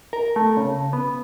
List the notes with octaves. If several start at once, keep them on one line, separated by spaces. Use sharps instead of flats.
A#4
A3
C#3
B3